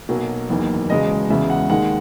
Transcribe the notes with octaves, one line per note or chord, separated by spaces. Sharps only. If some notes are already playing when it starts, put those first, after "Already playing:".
B1 B2 F#3 A#3
F#1 E2 D#3 A#3
E1 E2 C#3 G#3 D#5
E1 E2 C#3 G#3 E5
F#5
D#2 D#3 G#3 F#5